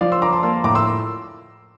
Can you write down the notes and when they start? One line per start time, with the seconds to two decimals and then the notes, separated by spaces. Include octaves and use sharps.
0.01 F3 D5 F5
0.12 C6 E6
0.22 F3 A#5 D6
0.32 A5 C6
0.43 A#3 A5 C6
0.64 A2 A#5 D6
0.75 C6 E6